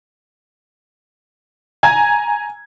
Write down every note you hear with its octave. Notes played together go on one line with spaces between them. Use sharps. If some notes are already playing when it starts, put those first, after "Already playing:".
G#5 A#5 G#6